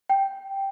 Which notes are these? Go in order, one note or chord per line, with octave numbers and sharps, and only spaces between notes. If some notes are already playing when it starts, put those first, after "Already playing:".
G5